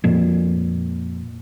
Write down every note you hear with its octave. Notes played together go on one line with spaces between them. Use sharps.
F2 A#2